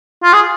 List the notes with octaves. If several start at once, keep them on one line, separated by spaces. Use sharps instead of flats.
F4
G#4